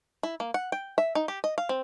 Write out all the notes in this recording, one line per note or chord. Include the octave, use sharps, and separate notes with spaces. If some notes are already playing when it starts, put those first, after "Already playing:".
E4
A#3
F#5
G5
E5
D#4
G4
D#5
F5
C4